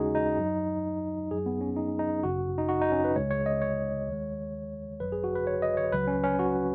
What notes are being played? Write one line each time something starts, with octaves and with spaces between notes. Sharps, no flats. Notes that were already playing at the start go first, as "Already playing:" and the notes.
Already playing: D#2 C#3 G#3 C#4 D#4 F#4 G#4
D#4
F#2 F#3
F#2 F#3 G#4
B3
C#4
D#4
D#4
G#1 F#2 C#3 F#4
D#4
F#4
D#4
C#4
B4
C#2 C#3 G#3 C#5
C#5
D#5
C#5
D#2 D#3 G#3
G#1 F#2 F#3 B4
G#4
F#4
B4
C#5
D#5
C#5
C#2 C#3 F#3 B4
C#4
C#4
F#4